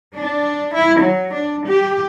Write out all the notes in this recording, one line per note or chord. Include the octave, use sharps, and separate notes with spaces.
D4
E4
F#3
D4
G4